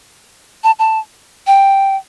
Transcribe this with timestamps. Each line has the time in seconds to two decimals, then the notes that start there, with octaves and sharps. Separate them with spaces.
0.64 A5
0.79 A5
1.47 G5